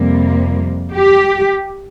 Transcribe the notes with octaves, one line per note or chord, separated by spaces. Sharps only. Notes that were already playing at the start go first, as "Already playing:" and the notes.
Already playing: F2 C3 G3 A#3
G4